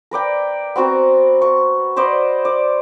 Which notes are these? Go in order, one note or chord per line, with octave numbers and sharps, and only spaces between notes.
A#4 B4 D5 G5
B3 C4 F#4 A#5
C#6
B4 C5 D5 D#5
D5